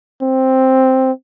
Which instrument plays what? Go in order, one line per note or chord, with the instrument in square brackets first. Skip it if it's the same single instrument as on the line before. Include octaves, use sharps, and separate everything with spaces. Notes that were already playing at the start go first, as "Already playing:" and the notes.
[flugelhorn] C4